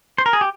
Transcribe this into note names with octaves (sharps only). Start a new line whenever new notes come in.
C5
A#4
G#4
G4